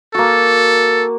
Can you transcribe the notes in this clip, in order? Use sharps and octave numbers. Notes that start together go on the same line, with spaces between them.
A#3 F#4 A4